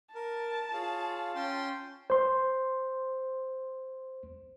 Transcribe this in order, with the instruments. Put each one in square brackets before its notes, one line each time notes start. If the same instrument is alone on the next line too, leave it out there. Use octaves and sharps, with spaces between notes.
[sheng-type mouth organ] A#4 [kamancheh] A5
[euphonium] F4 [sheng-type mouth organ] G#4 C#5 F5
[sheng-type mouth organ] C#4 G5 C6
[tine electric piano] C5 C6